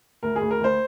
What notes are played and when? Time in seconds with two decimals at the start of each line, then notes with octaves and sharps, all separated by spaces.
0.23 D2 A#4
0.36 G#4
0.41 D2
0.51 A#4
0.60 D2 C5